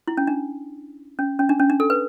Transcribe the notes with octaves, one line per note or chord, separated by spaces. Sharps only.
E4
C#4
D4
C#4
C#4
D4
C#4
D4
A4
B4